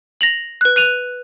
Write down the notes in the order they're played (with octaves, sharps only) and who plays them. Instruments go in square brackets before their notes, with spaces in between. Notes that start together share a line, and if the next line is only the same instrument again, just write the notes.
[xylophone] A#6 F7 F#7
B4 F#6
F#6 D#7 F7